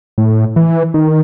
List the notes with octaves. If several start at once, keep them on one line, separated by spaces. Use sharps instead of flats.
A2
E3
D#3